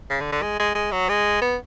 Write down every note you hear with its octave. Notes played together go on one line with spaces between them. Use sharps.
C#3
D3
D3
G#3
G#3
G#3
F#3
G#3
B3